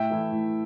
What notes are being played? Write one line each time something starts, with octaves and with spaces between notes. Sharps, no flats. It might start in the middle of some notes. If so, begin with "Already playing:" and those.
Already playing: A2 E5 G5
E3 A3 E4
A2